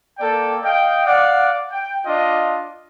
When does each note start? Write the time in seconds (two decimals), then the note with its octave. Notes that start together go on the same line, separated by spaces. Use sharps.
0.18 A#3 A4 D5 G5
0.63 D#5 F5 G5
1.05 D5 F5 F#5
1.69 G5
2.05 D4 F4 D#5